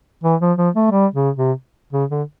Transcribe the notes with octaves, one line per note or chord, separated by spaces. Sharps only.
E3
F3
F3
A3
G3
C#3
C3
C#3
D3